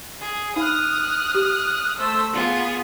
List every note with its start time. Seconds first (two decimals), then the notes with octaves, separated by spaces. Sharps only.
0.20 G#4
0.56 D#4 D#6 F6 F#6
1.35 G4
1.98 A3 C5 E6
2.32 B3 F4 G#4